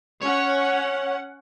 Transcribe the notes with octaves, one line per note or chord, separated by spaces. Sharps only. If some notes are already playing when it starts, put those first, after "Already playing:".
C#4 C#5 F#5